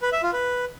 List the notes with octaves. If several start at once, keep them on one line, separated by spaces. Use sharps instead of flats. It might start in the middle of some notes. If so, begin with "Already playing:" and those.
B4
E5
F4
B4